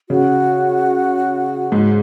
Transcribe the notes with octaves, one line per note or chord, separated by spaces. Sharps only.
C#3 F#4
G#2 G#3